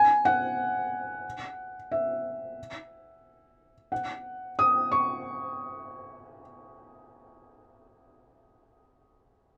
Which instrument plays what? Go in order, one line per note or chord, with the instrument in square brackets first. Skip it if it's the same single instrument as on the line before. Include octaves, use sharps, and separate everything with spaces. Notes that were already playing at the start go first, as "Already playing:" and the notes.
Already playing: [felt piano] G#5
F#5
E5
F#5
D#6
C#6